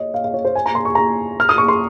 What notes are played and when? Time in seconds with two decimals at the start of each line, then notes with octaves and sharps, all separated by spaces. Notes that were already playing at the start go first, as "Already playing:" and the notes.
Already playing: C#5 D#5
0.14 F5
0.24 F5
0.34 C#5
0.45 C5
0.55 G#5
0.66 A#5
0.75 C6
0.85 C#6
0.95 A#5
1.40 F6
1.49 D#6
1.58 C#6
1.68 C6